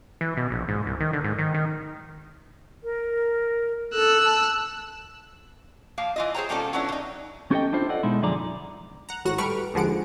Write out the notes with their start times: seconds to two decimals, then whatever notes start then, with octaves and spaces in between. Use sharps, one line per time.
0.21 E3
0.37 B2
0.50 A#1
0.68 G#2
0.86 C2
1.00 D#3
1.13 D3
1.24 G#2
1.39 D#3
1.54 D#3
2.84 A#4
3.93 A4 E6 F#6
4.24 A5
5.98 F3 A#3 F5
6.16 E3 F4 D#5
6.34 G#4 C5 C#5 G5 A#5
6.49 B2 G3 A#3 C#4 F4 A4
6.73 F#3 B3 C#4 D4 E4
6.89 D3 D#4
7.51 C#4 G4 A4 B4 D#5 G5
7.73 D4 E4 F4 C5
7.89 A4 D5 D#5 F#5
8.03 B2 G#3 D#4 E4
8.22 F#2 D3 F3 G#4 D5 A#5
9.09 F#5 A#5
9.25 G#1 A2 F#4 F#5 A#6
9.38 G3 A3 B4 C#6 F6 D7
9.74 D#2 D3 F3 G#3 F#5 D7